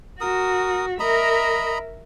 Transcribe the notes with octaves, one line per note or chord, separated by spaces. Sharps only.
F#4 A#4 D#6
A#4 D#5 E5 A#5 B5